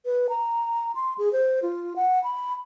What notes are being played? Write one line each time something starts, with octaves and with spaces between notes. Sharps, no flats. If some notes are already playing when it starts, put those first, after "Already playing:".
B4
A#5
C6
G#4
C5
F4
F#5
B5